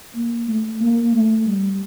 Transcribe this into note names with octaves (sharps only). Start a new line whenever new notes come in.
A#3
A3
A#3
A3
G3